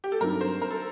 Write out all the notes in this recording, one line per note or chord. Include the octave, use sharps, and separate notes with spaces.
G4
A4
G2 F#3 C4 D#4 A#4
C5
A#4
A4